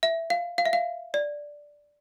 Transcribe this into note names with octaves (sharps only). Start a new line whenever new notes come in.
E5
F5
F5
E5
F5
D5